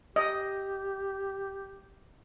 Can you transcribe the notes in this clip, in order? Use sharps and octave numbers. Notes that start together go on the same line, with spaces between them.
G4 D#5